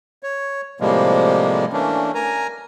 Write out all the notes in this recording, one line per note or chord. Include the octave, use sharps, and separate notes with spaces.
C#5
A2 C3 F3 G3 G#3 A#3
E3 A3 A#3 C#4 D4
A#4 G#5 A#5